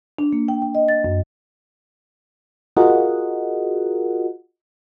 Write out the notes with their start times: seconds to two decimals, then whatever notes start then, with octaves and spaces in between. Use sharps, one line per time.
0.19 D4
0.33 A#3
0.48 G5
0.62 G5
0.75 D#5
0.88 A6
1.04 F#2
2.77 F4 F#4 G#4 A#4 D#5 F#5